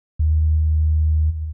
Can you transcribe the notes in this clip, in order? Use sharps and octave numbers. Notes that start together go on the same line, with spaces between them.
D#2